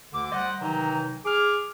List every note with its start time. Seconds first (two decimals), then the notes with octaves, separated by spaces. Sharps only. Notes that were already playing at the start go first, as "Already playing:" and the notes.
0.13 D2 D3 D6
0.32 G3 C5 D5 D#5 F#5
0.61 C3 D#3 E3 F#3 D#4
1.25 G#4 D6 F6